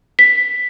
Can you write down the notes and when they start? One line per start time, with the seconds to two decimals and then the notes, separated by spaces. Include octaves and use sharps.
0.19 B6